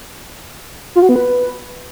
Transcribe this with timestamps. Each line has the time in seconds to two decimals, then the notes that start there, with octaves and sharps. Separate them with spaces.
0.95 F4
1.02 F#4
1.09 B3
1.16 B4